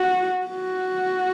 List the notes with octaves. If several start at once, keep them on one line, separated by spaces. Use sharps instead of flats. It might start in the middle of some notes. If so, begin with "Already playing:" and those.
Already playing: F#4
F#4